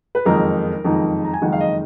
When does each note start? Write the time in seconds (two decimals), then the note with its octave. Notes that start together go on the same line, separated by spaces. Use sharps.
0.15 B4
0.25 F#1 F2 D#3 G#3 D#4 A#4
0.84 F#1 F2 D#3 G#3 D#4
1.25 A#5
1.34 G#5
1.41 F#1 F2 D#3 G#3 D#4 F#5
1.52 F5
1.60 D#5